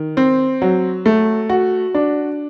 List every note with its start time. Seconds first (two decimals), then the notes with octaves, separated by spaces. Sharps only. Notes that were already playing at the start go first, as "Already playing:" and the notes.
Already playing: D#3
0.17 C4
0.62 F#3
1.06 A3
1.50 F#4
1.95 D4